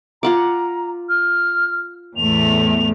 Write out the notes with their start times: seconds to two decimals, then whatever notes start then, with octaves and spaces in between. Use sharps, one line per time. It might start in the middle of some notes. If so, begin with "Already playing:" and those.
0.23 F4 F#5 A#5 D6
1.09 F6
2.17 E2 A2 A3 F7